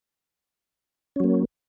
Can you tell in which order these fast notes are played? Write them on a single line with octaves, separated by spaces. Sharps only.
C#4 F#3 A#3